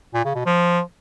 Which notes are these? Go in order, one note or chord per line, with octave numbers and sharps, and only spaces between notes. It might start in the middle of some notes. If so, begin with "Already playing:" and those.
A#2
C#3
B2
F3